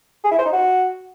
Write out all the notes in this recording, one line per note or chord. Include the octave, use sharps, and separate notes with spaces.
G#4
E4
C5
D#4
F#4